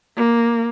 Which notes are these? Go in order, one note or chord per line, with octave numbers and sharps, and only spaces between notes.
A#3